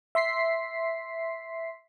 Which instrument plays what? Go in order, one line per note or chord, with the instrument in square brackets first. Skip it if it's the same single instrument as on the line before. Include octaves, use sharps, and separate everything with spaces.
[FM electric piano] E5 C6 B6 C7